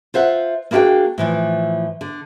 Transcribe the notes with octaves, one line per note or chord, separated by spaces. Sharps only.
F4 C5 E5 F#5
A#3 D4 E4 F#4 G#4 G5
A2 E3 F3
D3